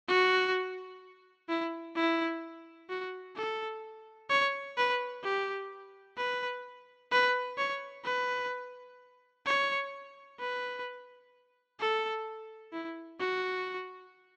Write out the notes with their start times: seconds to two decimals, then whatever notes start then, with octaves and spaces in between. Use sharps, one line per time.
0.08 F#4
1.49 E4
1.96 E4
2.90 F#4
3.37 A4
4.29 C#5
4.77 B4
5.24 G4
6.17 B4
7.12 B4
7.58 C#5
8.05 B4
9.46 C#5
10.39 B4
11.80 A4
12.73 E4
13.20 F#4